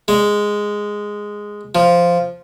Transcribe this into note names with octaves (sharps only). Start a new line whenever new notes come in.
G#3
F3